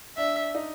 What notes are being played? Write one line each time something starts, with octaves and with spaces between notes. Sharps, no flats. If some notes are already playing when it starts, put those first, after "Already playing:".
D4 E5
D#4